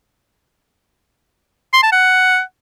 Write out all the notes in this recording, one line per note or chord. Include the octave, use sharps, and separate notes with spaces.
C6
A5
F#5